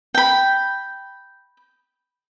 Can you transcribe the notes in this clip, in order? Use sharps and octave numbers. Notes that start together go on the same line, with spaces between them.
G5 B5